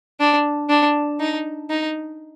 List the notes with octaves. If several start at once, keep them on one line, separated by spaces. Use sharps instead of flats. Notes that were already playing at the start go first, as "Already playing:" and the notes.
D4
D4
D#4
D#4